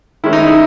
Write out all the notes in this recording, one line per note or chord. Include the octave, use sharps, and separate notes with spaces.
D#3 G#3 C#4 E4
D#4
E4